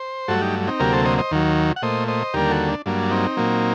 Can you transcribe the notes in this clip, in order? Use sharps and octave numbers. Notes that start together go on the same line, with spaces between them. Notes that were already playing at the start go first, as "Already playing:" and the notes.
Already playing: C5
G2 F#3 A3 F#4 A4
D#4 G4
C4 D#4
D2 C3 F#3 A#3 G4 A#4
A4 C5
C5 D#5
C5 D#5
D#2 D#3 F#3
F#5
A#2 A3 C5 D#5
C5 D#5
D#2 D3 G3 A#3 G4 A#4
F#4 A4
D4
G2 F#3 A#3 D4
C4 D#4
A#2 F#3 A#3